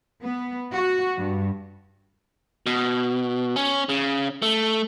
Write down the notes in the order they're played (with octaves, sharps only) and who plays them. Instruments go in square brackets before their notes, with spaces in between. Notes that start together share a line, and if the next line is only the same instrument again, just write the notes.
[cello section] B3
F#4
G2
[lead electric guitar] B2
C#4
C#3
A3